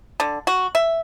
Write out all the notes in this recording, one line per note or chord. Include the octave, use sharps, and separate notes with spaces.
D3
F#4
E5